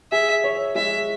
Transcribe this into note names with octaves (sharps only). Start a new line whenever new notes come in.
G#4 E5
C#5
G#3 E5